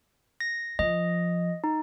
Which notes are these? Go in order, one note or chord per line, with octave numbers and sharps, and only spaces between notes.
A#6
F3 D#5
D#4